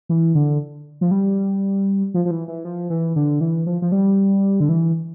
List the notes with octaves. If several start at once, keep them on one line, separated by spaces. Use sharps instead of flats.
E3
D3
F3
G3
F3
F3
E3
E3
F3
E3
D3
E3
F3
F3
G3
D3
E3